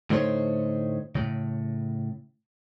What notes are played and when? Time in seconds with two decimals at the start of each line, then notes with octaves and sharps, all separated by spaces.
0.10 A2 D3 A3 D#4 C5 C#5
1.15 A2 C#3